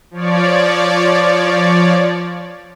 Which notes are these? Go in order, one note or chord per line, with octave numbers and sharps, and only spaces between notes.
F3 C#5 D5